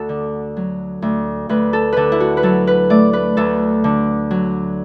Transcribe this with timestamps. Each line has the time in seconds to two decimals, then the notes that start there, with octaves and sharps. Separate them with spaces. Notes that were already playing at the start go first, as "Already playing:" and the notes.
Already playing: D2 F#4 A4
0.09 D3
0.57 F#3
1.02 D2
1.49 D2 B4
1.73 A4
1.93 D3 A4 B4
2.12 E4
2.20 F#4
2.37 B4
2.43 F#3 A4
2.67 B4
2.90 A3 D5
3.13 B4
3.37 D2 A4
3.84 D3
4.31 F#3